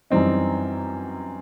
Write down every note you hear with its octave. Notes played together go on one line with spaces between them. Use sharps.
F#2 E3 G3 C4 D#4